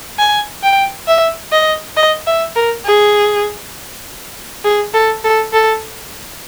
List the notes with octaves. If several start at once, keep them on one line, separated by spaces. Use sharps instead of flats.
G#5
G5
E5
D#5
D#5
E5
A#4
G#4
G#4
A4
A4
A4